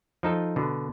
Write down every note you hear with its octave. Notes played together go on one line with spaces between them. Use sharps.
F3 D#4 A4
B2 D3